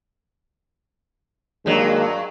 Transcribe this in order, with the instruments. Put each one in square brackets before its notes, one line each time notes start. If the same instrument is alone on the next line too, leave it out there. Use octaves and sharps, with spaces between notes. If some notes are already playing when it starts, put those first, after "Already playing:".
[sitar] G2 F#3 [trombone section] D#3 G#3 A#3